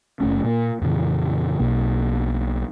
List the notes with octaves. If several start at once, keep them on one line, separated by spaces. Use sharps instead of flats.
F#1 G2 A3 C#4
A#2 A#3
F2 A#2 C#3 E3
B1 B2 A#3